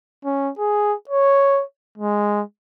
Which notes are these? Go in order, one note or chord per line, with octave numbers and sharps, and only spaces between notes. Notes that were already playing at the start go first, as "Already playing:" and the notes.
C#4
G#4
C#5
G#3